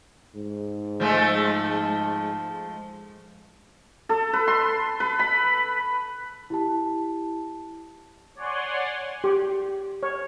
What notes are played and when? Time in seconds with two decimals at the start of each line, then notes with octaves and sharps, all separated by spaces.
0.36 G#2
1.00 F3 G#3 A3
4.09 A4
4.33 B4
4.47 C6
5.00 B4
5.19 B5
6.50 E4 G4 A5
8.35 C#5 D5 F#5 G#5 C6
9.24 G4
10.03 C#5